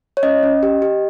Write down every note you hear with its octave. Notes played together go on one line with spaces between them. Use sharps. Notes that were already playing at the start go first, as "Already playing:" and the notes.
C#5
C#4 D#5
C#4
G4
G4